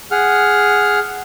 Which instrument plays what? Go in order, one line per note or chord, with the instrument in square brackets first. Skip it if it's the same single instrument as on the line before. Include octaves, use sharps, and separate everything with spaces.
[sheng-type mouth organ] G#4 F#5 F6